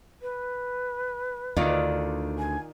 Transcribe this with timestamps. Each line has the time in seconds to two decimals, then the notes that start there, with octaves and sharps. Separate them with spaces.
0.21 B4
1.56 D2 D3 D#3 F4 D5
2.38 G#5